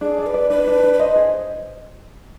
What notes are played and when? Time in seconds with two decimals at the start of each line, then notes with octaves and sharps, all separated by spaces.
0.01 D4 G#4
0.18 D5
0.26 B4
0.34 D5
0.50 D4 B4
0.67 D4
0.83 D4
0.94 B4
1.00 C5 D#5
1.15 G#4